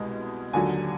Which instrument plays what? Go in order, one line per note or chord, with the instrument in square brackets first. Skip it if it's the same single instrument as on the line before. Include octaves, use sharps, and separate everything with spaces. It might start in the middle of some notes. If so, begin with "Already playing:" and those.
Already playing: [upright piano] C2 B2 G#3
D#2 D3 F#3 G#5